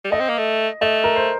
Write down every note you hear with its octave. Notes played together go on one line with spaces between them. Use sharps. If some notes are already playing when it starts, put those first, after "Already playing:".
G3
A3 D#5
C4
A#3
A3
A3 D#5
A#4
C5